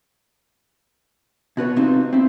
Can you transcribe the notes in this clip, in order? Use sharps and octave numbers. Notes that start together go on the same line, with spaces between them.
B2 F#4 B4 C#5
C3 C4 D#4 F4
C4 E4